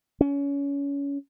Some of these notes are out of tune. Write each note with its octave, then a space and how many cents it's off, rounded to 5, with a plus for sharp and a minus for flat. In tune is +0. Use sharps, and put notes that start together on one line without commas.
C#4 +25